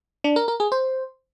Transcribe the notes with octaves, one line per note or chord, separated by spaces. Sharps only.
D4
A#4
A#4
G#4
C5